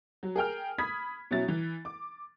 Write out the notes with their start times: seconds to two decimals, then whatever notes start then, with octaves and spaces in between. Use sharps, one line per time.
0.23 F#3
0.36 G#4 A#4 G5 F6
0.78 B5 D#6 G#6 B6
1.31 B2 F#3 C#4 E4 A6
1.48 E3
1.85 D6